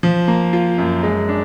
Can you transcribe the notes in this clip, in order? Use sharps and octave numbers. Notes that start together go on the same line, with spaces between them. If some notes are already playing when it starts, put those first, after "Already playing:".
F3
A#3
F4
F#2
G#3
D4